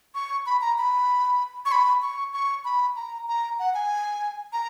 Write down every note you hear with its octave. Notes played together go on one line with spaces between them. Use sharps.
C#6
B5
A#5
B5
C#6
B5
C#6
C#6
B5
A#5
A#5
F#5
G#5
A#5